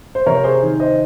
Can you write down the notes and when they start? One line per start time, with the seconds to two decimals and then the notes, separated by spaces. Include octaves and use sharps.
0.15 C5
0.26 C3 A#4 C#5
0.44 G#4 C5
0.62 D#3
0.80 C5 D#5